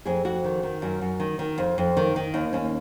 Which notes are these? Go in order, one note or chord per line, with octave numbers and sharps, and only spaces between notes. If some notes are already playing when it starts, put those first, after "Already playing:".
F2 G#4
F2 F#4
D#3
D#3
F#2 F#4
F#2
D#3
D#3
F2
F2
D#3
D#3
D#2 D#4
D#2 C#4